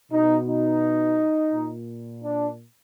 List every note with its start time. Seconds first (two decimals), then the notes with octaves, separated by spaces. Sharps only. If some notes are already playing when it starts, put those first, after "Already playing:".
0.11 B2 D#4
0.47 D#4
1.52 A#2
2.24 D4